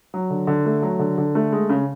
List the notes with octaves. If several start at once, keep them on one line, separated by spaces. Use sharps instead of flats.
F#3
D3
D3
A3
F#3
D3
D3
A3
G#3
C#3